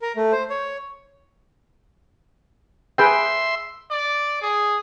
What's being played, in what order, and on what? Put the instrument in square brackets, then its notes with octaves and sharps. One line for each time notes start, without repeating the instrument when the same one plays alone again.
[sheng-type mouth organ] A#4
A3
C5
C#5
[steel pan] G#4 B4 G5 [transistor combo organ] E5 C6
[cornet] D5
G#4